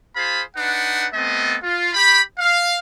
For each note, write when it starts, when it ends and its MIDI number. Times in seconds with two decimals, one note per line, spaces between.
0.16 0.42 65
0.16 0.42 68
0.16 0.42 72
0.16 0.42 77
0.16 0.42 83
0.57 1.07 62
0.57 1.07 63
0.57 1.07 71
0.57 1.07 78
1.14 1.57 57
1.14 1.57 59
1.14 1.57 60
1.14 1.57 69
1.14 1.57 75
1.63 1.90 65
1.94 2.22 67
1.94 2.22 83
2.39 2.78 77